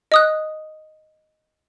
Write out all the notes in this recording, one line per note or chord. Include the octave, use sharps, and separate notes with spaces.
D#5 D#6 F#6